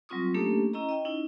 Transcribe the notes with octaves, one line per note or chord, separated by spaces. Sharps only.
F#3 G3 C4 F4 C#6 D#6
A3 A#3 C#4 D4 G4 A4
C#4 E4 D#5 A#5
D#5 G5
C#4 D#4 E4